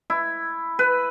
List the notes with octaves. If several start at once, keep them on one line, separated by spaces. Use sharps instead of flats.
E4
B4